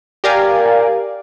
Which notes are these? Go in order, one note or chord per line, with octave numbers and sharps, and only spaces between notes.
G4 A#4 D5 F5 G#5